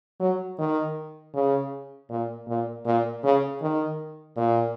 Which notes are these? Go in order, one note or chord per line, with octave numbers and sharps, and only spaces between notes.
F#3
D#3
C#3
A#2
A#2
A#2
C#3
D#3
A#2